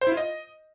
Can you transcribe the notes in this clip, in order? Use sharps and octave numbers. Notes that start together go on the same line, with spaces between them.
C5
E4
F4
D#5